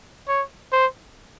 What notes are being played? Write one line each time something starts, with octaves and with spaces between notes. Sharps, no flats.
C#5
C5